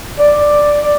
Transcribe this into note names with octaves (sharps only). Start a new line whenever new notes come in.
D5